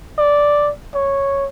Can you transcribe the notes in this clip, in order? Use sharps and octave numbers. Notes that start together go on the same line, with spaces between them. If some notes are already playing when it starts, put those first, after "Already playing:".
D5
C#5